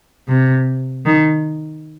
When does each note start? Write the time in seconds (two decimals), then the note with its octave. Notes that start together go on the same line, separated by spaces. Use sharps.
0.28 C3
1.05 D#3